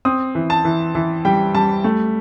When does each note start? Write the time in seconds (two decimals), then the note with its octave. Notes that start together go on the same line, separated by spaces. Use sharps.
0.05 C4 D#6
0.35 E3
0.50 A5
0.65 E3
0.95 E3
1.25 G3 G5
1.54 G3 A5
1.84 A3